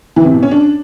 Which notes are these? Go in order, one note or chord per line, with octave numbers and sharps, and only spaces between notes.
E3
C3
B2
C#4
D4